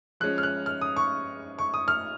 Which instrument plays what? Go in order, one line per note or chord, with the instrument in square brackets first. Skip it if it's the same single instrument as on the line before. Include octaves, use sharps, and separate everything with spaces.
[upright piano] F3 G#3 C#4 F#6
F6
F#6
F6
D#6
C#6
C#6
D#6
F6